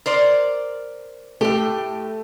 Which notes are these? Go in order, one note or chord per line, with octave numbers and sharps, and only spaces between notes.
A#4 C5 D5
A2 A3 G4